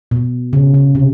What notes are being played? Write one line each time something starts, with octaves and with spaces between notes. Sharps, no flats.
B2
C#3
C#3
C3